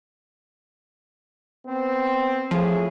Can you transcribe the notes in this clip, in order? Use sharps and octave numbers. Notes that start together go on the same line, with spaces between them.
B3 C4
A2 F3 G#4